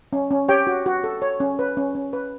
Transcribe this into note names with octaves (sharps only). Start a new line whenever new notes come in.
C#4
C#4
G4 C#5 G5
F#4
F#4
A4
C#5
C#4
B4
C#4
C#4
B4